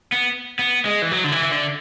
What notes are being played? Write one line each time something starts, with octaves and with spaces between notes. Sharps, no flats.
B3
B3
G#3
E3
F#3
D3
E3
E3
D3